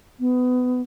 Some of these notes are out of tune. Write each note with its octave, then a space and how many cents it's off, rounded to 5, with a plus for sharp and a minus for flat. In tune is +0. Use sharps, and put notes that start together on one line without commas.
B3 +20